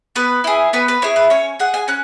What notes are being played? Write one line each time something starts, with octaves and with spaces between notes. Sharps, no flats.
B3 B4
E4 G#4
B3 B4
B4
E4 G#4 C#5
B4
C#4 C#5
G#4 F#5
G#5
C#4 F#6